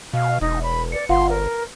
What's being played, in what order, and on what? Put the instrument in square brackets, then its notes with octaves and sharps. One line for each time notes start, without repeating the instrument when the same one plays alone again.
[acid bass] B2 [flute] F5
[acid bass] E1 [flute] D#4
[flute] B5
[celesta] B4 C#7 [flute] D5
[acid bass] G1 [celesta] F4 F5 F#5 [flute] C6
[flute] A#4 [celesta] B4